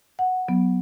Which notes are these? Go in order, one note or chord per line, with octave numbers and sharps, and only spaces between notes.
F#5
F#3 B3